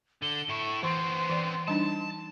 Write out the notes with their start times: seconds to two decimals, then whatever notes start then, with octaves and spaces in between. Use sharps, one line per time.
0.22 D3 G7
0.49 A2 E4 C#6
0.83 E3 B3 C4 C6
1.30 E3 D5
1.68 G3 D4 D#4 A5